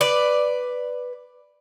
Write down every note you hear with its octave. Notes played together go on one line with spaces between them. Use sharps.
B4 D5